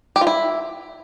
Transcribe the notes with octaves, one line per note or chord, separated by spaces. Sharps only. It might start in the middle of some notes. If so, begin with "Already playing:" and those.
G4
F4
E4